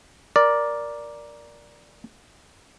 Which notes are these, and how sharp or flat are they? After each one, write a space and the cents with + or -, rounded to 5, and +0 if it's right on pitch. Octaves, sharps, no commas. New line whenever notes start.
A#4 +10 D5 +0